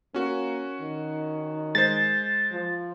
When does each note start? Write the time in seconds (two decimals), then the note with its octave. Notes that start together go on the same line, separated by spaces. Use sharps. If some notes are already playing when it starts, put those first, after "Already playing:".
0.14 A#3 C#4 F#4
0.81 D#3
1.75 G#3 C5 A6
2.51 F3